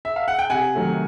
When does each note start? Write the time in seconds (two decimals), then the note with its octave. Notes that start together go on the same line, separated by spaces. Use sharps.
0.05 E5
0.16 F5
0.28 F#5
0.39 G5
0.50 C3 F#5 G#5
0.75 D#3 F#3 A3